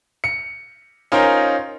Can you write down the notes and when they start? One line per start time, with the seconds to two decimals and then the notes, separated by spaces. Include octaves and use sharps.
0.24 C#7
1.12 C#4 D#4 F4 A#4 C5